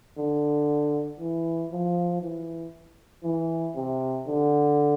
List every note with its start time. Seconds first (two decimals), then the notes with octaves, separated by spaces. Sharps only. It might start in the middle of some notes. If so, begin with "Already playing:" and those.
0.18 D3
1.19 E3
1.71 F3
2.22 E3
3.24 E3
3.75 C3
4.27 D3